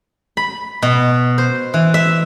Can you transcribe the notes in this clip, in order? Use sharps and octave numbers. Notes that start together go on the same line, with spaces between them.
B5
B2
C5
E3
E5